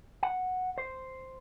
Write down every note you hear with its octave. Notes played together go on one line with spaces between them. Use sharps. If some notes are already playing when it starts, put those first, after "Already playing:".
F#5
C5